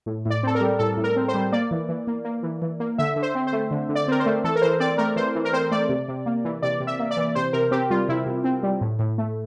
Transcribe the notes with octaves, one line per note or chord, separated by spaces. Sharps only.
A2
A2 D5
C4 A4
A#4
G3
A2 A4
A2
A#4
C4
C5
G3
A#3 D5
E3
E3
A#3
A#3
E3
E3
A#3
D3 E5
D3
C5
C4
C5
A3
D3
D3
D5
C4 A#4
C5
A3
E3 A4
A#4
E3 C5
C4 D5
A3 A#4
E3 C5
E3
A#4
C4 C5
A3 D5
C3
C3
A#3
E3
C3 D5
C3
E5
A#3
D5
E3
C3 C5
C3 A#4
C4 G4
G3 F4
C3 E4
C3
C4
G3
A2
A2
A3